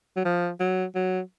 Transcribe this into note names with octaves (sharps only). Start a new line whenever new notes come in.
F#3
F3
F#3
F#3